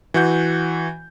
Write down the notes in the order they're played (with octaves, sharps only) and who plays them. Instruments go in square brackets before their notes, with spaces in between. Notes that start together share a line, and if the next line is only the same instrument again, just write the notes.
[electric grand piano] E3 F#4 F#5 G6